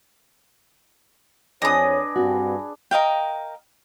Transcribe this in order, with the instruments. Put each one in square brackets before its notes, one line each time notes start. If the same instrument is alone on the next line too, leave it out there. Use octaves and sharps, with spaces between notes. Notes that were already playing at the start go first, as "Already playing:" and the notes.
[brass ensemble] F2 C#5 [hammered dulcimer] D4 G#4 B4 [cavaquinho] D#5 D#6
[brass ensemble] G2 [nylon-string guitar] C4 F#4
[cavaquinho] A#4 D#5 F5 G5